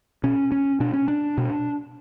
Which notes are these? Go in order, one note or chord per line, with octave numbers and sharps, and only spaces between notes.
B2 C#4
C#4
B2 D4
C#4
D4
B2